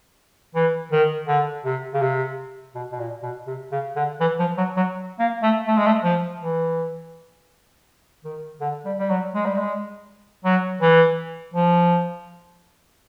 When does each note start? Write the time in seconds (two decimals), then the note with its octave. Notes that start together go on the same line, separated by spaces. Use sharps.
0.55 E3
0.92 D#3
1.28 D3
1.65 C3
1.94 C#3
2.01 C3
2.75 B2
2.92 B2
2.99 A#2
3.23 B2
3.47 C3
3.72 C#3
3.96 D3
4.20 E3
4.39 F3
4.58 F#3
4.77 F#3
5.19 A#3
5.43 A3
5.67 A3
5.77 G#3
5.86 A3
6.04 F3
6.40 E3
8.24 D#3
8.61 D3
8.85 G3
8.99 G3
9.10 F#3
9.35 G#3
9.46 G3
9.58 G#3
10.45 F#3
10.81 E3
11.54 F3